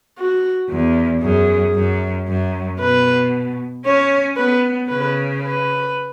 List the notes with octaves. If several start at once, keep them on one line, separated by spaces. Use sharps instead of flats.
F#4
E2
F#2 G#4
F#2
F#2
B2 B4
C#4 C#5
B3 B4
C#3 B4
B4